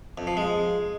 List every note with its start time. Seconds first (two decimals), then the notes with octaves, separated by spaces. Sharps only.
0.18 F2
0.27 F3
0.37 G#3